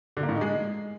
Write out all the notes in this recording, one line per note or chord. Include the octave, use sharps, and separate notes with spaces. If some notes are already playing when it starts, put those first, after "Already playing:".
D3
A#3
A2
D#4
G#3